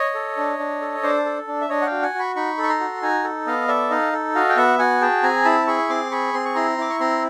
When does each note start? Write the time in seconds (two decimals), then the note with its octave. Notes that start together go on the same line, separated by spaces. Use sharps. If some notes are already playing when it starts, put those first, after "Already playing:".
Already playing: C#5 D#5
0.15 A4
0.37 D4
0.59 D4
0.81 A4
1.03 D4 C5 D5
1.25 A4
1.48 D4
1.61 E5
1.69 D4 C#5 D#5
1.82 F#5
1.86 F5 G5
1.91 F#4
2.02 F#5 G#5
2.14 F#4
2.19 B5 C#6
2.36 D#4 B5 C#6
2.58 A4
2.63 C#6
2.69 A#5 C6
2.80 F#4
3.02 D#4 G#5 A#5
3.24 A4
3.47 B3 D#5 F5
3.68 A4 D5 E5
3.90 D#4 D#5 F5
4.13 A4
4.35 F#4 D#5 F5
4.49 G5
4.56 B3 E5 F#5
4.79 F#4 F#5 G#5
5.01 G#4 G5 A5
5.23 C4 G#5 A#5
5.45 E4 A5 B5
5.67 G#4 B5 C#6
5.89 C4 C6 D6
6.11 G#4 B5 C#6
6.34 C4 C6
6.45 C#6
6.55 E4 A#5 C6
6.78 E4 D6
6.90 C#6
7.00 C4 A#5 C6